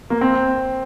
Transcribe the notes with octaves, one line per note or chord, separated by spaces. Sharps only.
A#3
C4